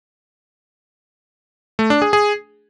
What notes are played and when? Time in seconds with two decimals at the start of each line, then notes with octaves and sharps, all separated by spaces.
1.79 A3
1.90 D4
2.02 G#4
2.13 G#4